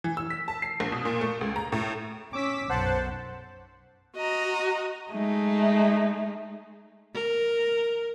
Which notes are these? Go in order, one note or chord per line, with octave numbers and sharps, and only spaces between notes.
E3
E6
B6
A5
C7
A#1
B2
A#2
A3
C#2
A#5
A2
C#4 D6 E6 B6
B1 F#2 C5 F#5 A5
F#4 D#5 A#5
G#3 A3 D#4
A#4